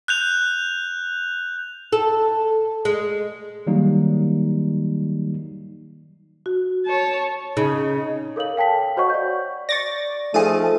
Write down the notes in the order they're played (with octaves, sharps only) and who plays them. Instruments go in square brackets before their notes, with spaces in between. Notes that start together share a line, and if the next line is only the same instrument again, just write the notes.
[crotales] F#6 G6 F7
[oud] A4
G#3
[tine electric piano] D#3 F#3 G3 A#3 D#4
[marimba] F#4
[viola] C#5 A5
[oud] C#3 [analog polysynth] D#4
[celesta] A4 A#4 C#5 F5 F#7
F5 G5 A5 B6
F#4 C5 C#5 D#5 F#5 C#6
D5 G6
[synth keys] D5 [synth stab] C#6 A6 A#6
[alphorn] F3 [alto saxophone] A3 [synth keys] D#4 F4 A4 [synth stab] G#4 D#7